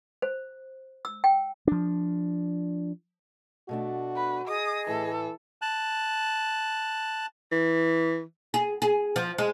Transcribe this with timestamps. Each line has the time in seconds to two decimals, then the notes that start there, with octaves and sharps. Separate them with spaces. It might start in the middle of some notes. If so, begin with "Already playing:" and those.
0.22 C5
1.05 E6
1.24 G5
1.67 F3 D4
3.69 B2 A3 D4 F#4
4.16 B4
4.48 G#4 D#5 D#6
4.88 A2 E3 A4
5.62 A5 F#6
7.52 E3
8.54 G#4
8.82 G#4
9.16 F3
9.38 G#3